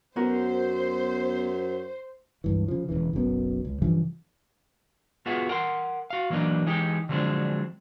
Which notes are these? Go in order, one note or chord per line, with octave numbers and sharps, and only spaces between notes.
F#2 B3 F#4 A#4 C5
C#2 G2 E3
C#3 F3
E1 C2 C#3 E3
F#1 B1 F#2 B3
C#2
G2 C#3 E3 F3
B3 F4 F#4 G#4 E5
A#4 F#5 C6
F#4 F5
E3 F#3 A#3 D4 D#4
E3 G#3 D#4 G4
D3 F3 F#3 G#3 C4 D4